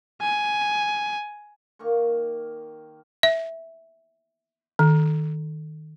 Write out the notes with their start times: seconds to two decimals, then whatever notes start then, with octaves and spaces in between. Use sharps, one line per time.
0.22 G#5
1.79 D#3 A#3 A#4 C#6
3.23 E5
4.79 D#3